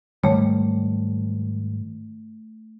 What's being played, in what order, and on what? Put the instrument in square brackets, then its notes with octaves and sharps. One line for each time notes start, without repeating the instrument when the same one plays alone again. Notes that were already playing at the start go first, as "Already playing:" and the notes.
[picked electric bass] G#2 D#3 G3 [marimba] A3 C#5